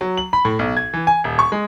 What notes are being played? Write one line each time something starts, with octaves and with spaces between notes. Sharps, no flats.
F#3
F#7
B5
A2
B1
G#6
E3
G#5
D#1
C#6
G#3